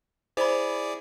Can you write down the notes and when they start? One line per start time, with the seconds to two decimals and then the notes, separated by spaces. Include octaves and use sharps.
0.37 E4 G#4 C5 D5 B5